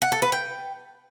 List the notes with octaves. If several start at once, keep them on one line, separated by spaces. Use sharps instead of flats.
F#5
A4
B4
G5